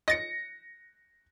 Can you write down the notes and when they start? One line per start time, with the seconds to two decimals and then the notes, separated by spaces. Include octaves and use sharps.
0.08 D#5 A6 A#6 C#7